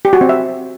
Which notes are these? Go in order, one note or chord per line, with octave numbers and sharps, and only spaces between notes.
G4
F#4
C4
E5